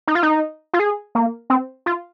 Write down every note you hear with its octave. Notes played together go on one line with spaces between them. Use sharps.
D#4
F4
D#4
F4
G#4
A#3
C4
F4